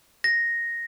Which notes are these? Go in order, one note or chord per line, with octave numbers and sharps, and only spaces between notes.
A#6